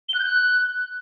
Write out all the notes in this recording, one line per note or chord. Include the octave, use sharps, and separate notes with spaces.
G7
F#6
G6
F#6